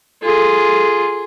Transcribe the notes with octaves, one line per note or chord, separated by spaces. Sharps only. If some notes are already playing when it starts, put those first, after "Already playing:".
F4 G#4 A4